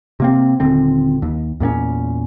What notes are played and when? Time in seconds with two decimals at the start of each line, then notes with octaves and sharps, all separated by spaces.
0.20 C3 A#3 C4
0.60 D#1 D3 C4
1.22 D#2
1.60 E2 A#2 B3 C#4